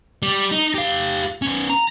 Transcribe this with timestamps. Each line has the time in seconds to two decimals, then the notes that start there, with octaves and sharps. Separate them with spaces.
0.22 G3
0.52 D#4
0.75 G4 F5
1.42 B3 C#4
1.70 A#5